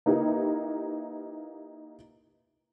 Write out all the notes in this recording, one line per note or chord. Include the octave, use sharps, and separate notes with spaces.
A#3 D#4 E4 G4 B4